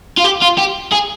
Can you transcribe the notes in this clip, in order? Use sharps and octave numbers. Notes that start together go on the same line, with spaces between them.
F4
G4
F4
G4
G#4